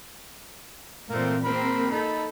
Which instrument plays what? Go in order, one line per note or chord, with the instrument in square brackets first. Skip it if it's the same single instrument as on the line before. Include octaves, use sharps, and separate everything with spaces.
[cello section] A#2 E3 C4 [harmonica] A3 A#3
[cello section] A#3 C4 [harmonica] A#4 B5
[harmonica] D#4 B5 [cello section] A4